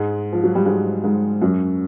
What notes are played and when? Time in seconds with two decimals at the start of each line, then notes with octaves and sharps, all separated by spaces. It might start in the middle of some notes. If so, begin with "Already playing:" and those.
Already playing: G#2 G#3
0.33 F3
0.44 F#3
0.55 G3
0.65 G#2 G#3
1.04 G#2 G#3
1.42 F#2 F#3